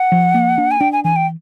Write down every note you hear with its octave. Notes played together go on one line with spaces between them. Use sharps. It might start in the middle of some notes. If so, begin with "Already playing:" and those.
Already playing: F#5
F3
A#3
D4
G#5
D4 G5
G#5
E3 G#5
G5